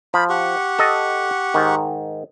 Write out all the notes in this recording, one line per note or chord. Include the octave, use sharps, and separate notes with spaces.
F3 B5
G4 F#5 C#6
A4 D#5
G#2 D#3